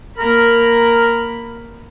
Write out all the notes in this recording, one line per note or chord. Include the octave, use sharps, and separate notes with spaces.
A#3 A#4 B5